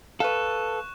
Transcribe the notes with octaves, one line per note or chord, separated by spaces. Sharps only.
A4 B4 F5 C#6 F#6 E7